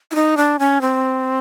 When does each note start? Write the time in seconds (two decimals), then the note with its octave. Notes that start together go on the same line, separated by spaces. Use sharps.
0.11 E4
0.15 D#4
0.37 D4
0.59 C#4
0.81 C4